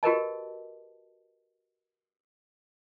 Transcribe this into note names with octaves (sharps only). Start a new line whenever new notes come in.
F#4 G4 A#4 B4 D#5 A5